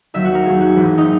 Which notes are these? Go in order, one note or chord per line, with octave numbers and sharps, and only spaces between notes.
D#2 D#3 F#3 E5
F#4
A#4
D#2 D#3 F#3 G#4
F#4
G#1 F#2 E3
D#4